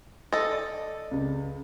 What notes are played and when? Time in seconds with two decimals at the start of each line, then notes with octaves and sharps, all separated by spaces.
0.33 A4 D#5
0.51 D5
1.11 C#2 C#3